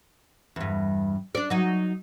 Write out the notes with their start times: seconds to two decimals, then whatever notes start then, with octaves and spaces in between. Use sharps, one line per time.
0.56 E2 G2
1.35 D4 D5
1.50 F#3 D#4